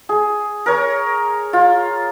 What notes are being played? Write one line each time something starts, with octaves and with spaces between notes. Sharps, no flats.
G#4
A#4 C#5
F4